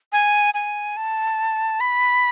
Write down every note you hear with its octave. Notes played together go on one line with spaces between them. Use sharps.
G#5
G#5
A5
B5